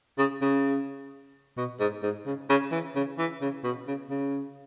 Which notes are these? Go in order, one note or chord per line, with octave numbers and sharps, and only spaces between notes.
C#3
C#3
B2
G#2
G#2
C#3
C#3
E3
C#3
E3
C#3
B2
C#3
C#3